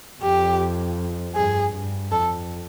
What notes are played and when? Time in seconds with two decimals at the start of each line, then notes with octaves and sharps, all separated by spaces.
0.22 F2 G4
1.35 G2 G#4
1.73 G2
2.11 F2 A4